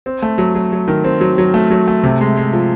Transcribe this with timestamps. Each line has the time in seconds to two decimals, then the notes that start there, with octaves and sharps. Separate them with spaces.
0.06 C4
0.22 A3
0.38 F#3
0.55 F#3
0.72 F#3
0.88 D#3
1.04 C4
1.21 F#3
1.38 F#3
1.54 A3
1.70 F#3
1.88 A3
2.03 C3
2.21 G#3
2.37 G#3
2.53 F3